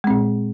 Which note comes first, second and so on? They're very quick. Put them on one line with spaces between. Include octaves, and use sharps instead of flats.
G#3 C4 A#2